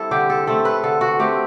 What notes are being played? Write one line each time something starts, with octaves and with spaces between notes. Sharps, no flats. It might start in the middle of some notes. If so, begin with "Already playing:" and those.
Already playing: G3 C4 E4 A4
D3 G4
A4
A3 C4 A4
B4
D3 A4
F#4
A3 C4 G4